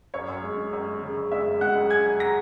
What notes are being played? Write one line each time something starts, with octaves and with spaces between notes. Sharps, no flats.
F#2 C#5 C#6
F#2
G#3
G#3
F#2
G#3
C#3
F#2
G#3 E5 E6
F#2
G#3 F#5 F#6
F#2
C#3 G#5 G#6
F#2
A#5 A#6